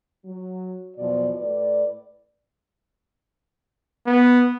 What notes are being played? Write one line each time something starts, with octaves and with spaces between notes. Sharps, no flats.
F#3
E2 B2 F3 F#3 D5
A2 B4 D5
B3